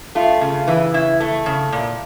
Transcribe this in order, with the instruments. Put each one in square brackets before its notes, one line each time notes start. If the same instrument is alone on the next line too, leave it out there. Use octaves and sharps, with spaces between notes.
[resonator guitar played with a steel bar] A3 F4
C#3
E3
C#3 E4
A3
C#3
A#2